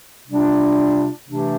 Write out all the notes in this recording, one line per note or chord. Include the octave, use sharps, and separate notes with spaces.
C3 G3 D4 F4
C3 E3 A3 D4 G4